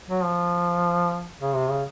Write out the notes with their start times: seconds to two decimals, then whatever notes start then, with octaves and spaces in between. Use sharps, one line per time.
0.09 F#3
0.23 F3
1.41 C#3
1.55 C3
1.70 C#3